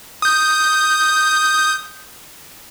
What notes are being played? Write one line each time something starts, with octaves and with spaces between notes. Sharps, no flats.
D#6 G6